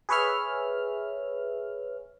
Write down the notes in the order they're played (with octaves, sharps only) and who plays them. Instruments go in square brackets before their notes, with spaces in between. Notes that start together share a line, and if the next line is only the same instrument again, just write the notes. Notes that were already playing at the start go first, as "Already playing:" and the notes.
[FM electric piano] G#4 B4 C#5 E5 F6